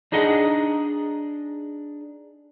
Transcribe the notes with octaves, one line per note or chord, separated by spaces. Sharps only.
D4 D#4 G#4 D#5 F#5